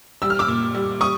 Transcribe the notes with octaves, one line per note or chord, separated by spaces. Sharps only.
G3 E6
F6
D6 E6
A#2
G3
G3 C#6 D#6